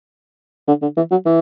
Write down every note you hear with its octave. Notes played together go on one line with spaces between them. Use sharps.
D3
D3
E3
F#3
E3